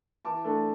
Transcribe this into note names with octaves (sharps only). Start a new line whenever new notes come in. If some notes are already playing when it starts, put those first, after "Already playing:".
E3 A5 D6
A3 D4